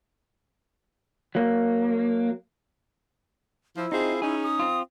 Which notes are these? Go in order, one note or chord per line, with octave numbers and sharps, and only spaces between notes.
F#3 A#3
F3 E4
C4 D#4 F4 G#4
C#4 D#4 G#4
D#6
C4 F4